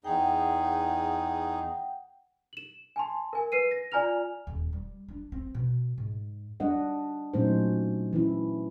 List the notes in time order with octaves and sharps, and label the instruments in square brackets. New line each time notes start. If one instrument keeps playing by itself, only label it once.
[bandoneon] E2 D#4 G#4 [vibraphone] F#5 G5
[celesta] E7 F#7
G#5 A5 C6
A#4 G#5
B4 C7 D#7
A#6
F4 D5 G#5 A#5 F6 F7
[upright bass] D#1
G3
D4
C4
B2
G#2
[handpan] G3 D4 D#5 F#5
A#2 F#3 A3 C#4 D#4 C5
E3 C#4 E4